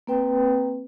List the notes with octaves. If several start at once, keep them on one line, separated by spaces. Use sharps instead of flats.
A#3 C4 B4 G5